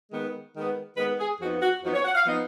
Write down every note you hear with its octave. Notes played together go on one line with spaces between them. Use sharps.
D#3 G#3 B3
D#3 G#3 B3
D#3 G#3 B3 B4
G#4
F2 F3 B3 D#4 F#4
F#4
F2 F3 B3 D#4 F#4
C#5
F#5
F5
F3 B3 D#4 D#5